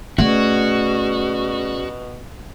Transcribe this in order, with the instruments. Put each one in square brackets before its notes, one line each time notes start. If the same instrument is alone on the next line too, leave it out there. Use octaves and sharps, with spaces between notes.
[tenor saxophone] B2 [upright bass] A3 [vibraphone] C#4 G#4 D5 [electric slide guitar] F#4